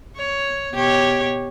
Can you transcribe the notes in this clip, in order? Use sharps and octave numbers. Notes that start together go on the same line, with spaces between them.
C#5
B2 G4 C#5